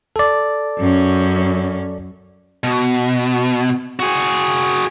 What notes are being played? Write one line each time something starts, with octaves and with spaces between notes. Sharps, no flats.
A4 D5
F#2 C#4
B2
F#4 G#4